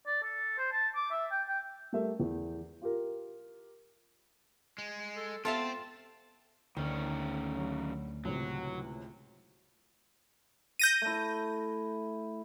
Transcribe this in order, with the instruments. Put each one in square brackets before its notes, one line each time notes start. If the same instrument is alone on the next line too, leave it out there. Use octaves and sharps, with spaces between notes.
[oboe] D5
A4
C5
A5
D6
E5
G5
G5
[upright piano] G3 A3 A#4 E5
E2
F4 G4 A#4
[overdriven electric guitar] G#3
[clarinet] A4
[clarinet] B3 [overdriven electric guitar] C4 [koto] F4 F5 A5 [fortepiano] A4 E5
[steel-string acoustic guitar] D2 [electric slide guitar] D#3 C#4
[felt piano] F#3
[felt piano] C#2 A2 C3 [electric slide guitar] F#3
[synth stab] G6 A#6 D#7
[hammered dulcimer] A3 E4